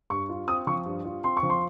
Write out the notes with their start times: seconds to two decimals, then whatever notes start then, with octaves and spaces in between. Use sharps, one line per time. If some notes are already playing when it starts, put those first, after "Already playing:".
0.10 G2 C#6
0.29 F4
0.48 C4 D#6
0.67 F3 C#6
0.86 G2
1.05 F4
1.24 C4 C6
1.37 C#6
1.43 F3
1.50 C6